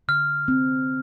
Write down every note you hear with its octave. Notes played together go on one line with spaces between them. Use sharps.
D3 F6
C4